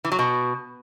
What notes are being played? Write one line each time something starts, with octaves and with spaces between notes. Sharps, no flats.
E3
F#3
B2